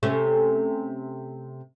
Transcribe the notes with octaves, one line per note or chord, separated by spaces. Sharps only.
C3 A3 C#4